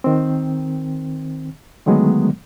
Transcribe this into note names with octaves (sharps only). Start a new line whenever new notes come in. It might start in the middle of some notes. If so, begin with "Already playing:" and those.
D#3 C4
D3 D#3 F#3 G#3 A3 B3